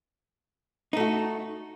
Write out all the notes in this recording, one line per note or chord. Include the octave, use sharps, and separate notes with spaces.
A3 D#4 F#4